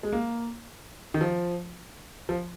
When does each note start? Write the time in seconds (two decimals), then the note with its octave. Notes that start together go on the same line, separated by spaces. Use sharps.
0.03 G#3
0.13 A#3
1.14 D#3
1.21 F3
2.29 F3